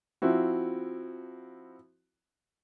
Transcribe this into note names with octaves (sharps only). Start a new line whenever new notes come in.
F3 C4 E4 F#4